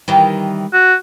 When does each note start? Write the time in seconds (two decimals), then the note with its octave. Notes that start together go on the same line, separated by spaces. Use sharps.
0.08 D#3 E3 G3
0.73 F#4